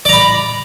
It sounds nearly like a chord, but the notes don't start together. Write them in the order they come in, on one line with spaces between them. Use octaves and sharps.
D5 A#5 B5